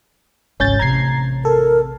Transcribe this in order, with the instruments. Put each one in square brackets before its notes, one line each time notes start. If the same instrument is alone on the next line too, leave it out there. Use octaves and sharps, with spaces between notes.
[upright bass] G#1 C#2 [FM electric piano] C#4 G6 A6
[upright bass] A1 C3 [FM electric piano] A#5 G#6 C7
[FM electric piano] A4 [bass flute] A#4